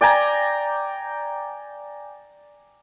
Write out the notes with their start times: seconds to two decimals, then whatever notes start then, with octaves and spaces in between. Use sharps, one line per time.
0.01 D5 G5 G#5 A#5